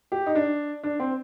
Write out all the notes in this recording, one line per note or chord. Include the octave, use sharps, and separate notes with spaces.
G4
D#4
D4
D4
C4